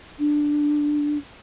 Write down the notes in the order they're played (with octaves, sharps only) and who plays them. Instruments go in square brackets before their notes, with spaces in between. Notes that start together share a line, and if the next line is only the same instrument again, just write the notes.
[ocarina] D4